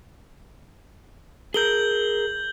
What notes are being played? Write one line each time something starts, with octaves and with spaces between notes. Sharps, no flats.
G#4 A#4 G6 F#7 G7